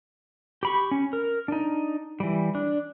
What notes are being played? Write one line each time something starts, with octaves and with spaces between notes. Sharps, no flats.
G4 B5 C#6
C#4
A#4
D4 D#4
E3 G3
D4